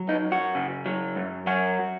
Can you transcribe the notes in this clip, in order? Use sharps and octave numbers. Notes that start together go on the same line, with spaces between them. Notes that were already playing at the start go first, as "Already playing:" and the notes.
Already playing: F#3
D#4
F#2
F#4
C#3
F#3
F#2
F#3 F#4